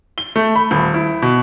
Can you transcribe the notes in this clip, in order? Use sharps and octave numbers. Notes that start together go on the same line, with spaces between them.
G7
A3
B5
D#1
E4
B2